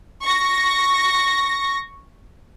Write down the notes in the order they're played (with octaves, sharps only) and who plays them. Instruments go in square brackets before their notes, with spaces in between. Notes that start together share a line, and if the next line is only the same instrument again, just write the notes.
[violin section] C#6 A#6